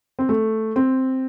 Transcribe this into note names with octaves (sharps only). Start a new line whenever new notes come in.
C4
A3
C4